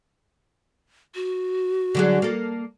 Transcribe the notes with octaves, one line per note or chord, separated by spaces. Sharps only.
F#4
D3 F#3 G#4
A#3 A4